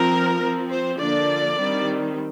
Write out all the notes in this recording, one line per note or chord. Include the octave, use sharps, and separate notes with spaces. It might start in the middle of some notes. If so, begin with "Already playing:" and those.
Already playing: F3 C4 A#4
F3 C4
C5
D3 F3 A#3 D4 D5
D#3 G3 C4